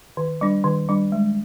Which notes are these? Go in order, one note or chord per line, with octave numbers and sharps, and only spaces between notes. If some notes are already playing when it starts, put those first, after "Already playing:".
D#3
G3 D4
D#3
G3 D4
G#3